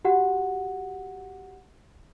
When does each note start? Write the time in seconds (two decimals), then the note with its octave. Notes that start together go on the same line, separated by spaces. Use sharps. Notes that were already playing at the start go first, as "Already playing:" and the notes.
0.05 F#4 G4 F#5